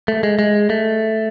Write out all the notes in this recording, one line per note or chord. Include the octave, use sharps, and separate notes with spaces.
A3
G#3
G#3
A3